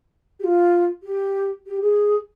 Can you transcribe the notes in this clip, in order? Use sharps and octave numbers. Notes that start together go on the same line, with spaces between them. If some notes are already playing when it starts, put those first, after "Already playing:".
G4
F4
G4
G4
G#4